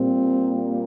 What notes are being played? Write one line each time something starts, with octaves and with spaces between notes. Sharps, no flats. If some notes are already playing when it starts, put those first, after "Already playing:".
Already playing: A#2 G3 A#3 C4